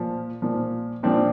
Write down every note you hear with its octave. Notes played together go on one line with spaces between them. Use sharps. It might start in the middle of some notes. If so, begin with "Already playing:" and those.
Already playing: A#2 F3
A#2 F3
A#2 F3 C4 D4